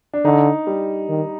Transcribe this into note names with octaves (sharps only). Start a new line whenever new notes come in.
D4
D3 D#4
G3
D#3